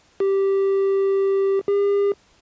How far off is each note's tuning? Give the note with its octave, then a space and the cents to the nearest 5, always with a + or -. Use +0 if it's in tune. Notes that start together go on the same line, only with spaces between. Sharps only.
G4 -5
G4 +45